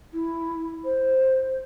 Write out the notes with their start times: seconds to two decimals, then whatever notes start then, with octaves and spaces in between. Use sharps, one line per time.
0.13 E4
0.84 C5